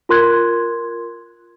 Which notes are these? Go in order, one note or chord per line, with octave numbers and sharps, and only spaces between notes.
F4 A#4 C6 F#6 G#6